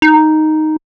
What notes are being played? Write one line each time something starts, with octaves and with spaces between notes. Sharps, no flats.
D#4